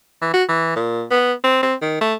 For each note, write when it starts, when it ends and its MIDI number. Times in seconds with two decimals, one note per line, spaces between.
0.22 0.31 52
0.34 0.43 66
0.49 0.72 52
0.76 1.03 46
1.11 1.32 59
1.44 1.62 60
1.62 1.75 60
1.82 1.97 51
2.01 2.15 57